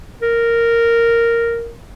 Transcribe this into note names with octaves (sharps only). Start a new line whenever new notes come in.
A#4